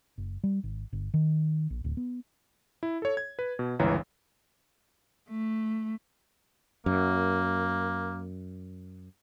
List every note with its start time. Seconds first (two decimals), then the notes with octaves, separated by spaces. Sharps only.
0.18 F#1
0.44 G3
0.64 G#1
0.93 G1
1.14 D#3
1.70 A#1
1.84 D1
1.97 B3
2.83 E4
3.02 A4 C#5
3.17 G#6
3.39 B4
3.59 B2
3.79 G1 C#2 E3 C#5 A#5
5.30 A3
6.86 F#2 A#3